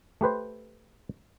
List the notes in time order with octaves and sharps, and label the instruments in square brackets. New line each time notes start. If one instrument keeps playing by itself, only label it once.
[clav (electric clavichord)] A3 G4 B4 C5